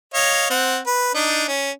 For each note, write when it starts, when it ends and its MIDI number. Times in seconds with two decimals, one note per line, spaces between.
0.14 0.48 73
0.14 0.48 75
0.14 0.48 77
0.50 0.79 60
0.50 0.79 78
0.87 1.10 71
1.15 1.45 62
1.15 1.45 63
1.48 1.71 61